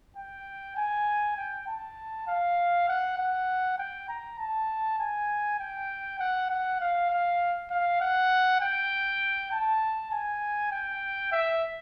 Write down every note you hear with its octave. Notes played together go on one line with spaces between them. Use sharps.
G5
G#5
G5
A5
F5
F#5
F#5
G5
A#5
A5
G#5
G5
F#5
F#5
F5
F5
F5
F#5
G5
A5
G#5
G5
E5